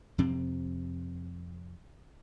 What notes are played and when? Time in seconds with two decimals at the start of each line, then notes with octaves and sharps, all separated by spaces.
0.18 F2 C3 C4